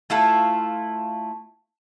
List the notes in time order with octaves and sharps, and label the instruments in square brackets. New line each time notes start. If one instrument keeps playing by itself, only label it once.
[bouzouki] A3 E4 F4 A4